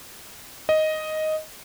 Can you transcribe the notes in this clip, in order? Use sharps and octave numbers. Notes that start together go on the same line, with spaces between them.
D#5